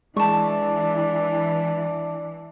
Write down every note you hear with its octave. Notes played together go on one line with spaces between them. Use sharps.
E3 G#3 D4 A5 C#6